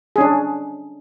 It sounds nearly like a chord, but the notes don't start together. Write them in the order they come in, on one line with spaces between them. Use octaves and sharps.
G#4 C#4 D4